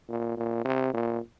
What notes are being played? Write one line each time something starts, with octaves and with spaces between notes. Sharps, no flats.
A#2
A#2
C3
A#2